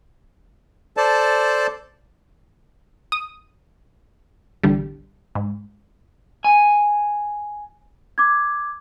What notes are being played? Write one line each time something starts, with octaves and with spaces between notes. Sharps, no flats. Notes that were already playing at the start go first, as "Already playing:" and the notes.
A4 C5 D5 A5
D#6
A1 E2 D3 G3
G#2
G#5
D6 G#6